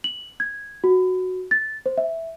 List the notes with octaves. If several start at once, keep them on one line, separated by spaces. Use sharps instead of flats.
F#7
G#6
F#4
A6
C5
E5